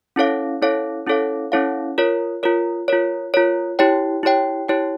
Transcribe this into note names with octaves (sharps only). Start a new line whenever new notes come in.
C#4 E4 A4 C#5 F5
C#4 E4 A4 C#5 F5
C#4 E4 A4 C#5 F5
C#4 E4 A4 C#5 F5
F4 A#4 C#5
F4 A#4 C#5
F4 A#4 C#5
F4 A#4 C#5
E4 G4 C#5 G5
E4 G4 C#5 G5
E4 G4 C#5 G5